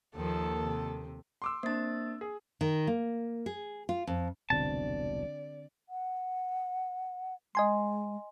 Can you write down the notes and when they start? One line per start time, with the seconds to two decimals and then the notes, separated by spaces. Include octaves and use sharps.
0.16 D#2 D#3 F3 A#3 A4
0.65 C3
1.42 C6 D6 E6
1.63 A#3 C4 D4 A6
2.21 G#4
2.61 D#3
2.87 A#3
3.46 G#4
3.89 F4
4.07 F2
4.50 E1 C2 B2 D3 C4 D5 A5
5.89 F#5
7.55 G#3 D#5 G#5 C6